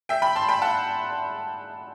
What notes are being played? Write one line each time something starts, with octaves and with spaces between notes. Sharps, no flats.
E5 G5
G5 B5
A5 C6
G5 B5
F#5 A5